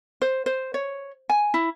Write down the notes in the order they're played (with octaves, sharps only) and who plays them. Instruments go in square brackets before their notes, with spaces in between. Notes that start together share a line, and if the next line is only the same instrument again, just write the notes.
[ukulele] C5
C5
C#5
G#5
E4